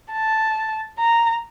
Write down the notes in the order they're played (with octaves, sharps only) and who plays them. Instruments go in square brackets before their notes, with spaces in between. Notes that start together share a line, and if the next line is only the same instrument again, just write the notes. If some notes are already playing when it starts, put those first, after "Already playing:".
[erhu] A5
A#5